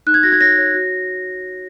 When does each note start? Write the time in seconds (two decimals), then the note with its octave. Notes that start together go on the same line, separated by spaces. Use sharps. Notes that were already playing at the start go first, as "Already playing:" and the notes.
0.07 D#4 F#6
0.14 G#6
0.23 F#4 A#6
0.32 G#6
0.40 C#5 A#6
0.58 C#5
0.74 F#4